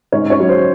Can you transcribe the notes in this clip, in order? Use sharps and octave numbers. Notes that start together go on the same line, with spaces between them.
G#2 C#4 C#5
C#4 C#5
F#3
C5